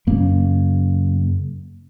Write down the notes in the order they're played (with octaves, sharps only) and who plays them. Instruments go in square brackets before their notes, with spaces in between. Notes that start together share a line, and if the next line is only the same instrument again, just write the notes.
[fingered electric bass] F#2 C#3 A#3